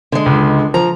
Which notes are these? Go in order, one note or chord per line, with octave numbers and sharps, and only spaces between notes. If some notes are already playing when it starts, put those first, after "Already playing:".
D3 G#3
C#2
F3 A#5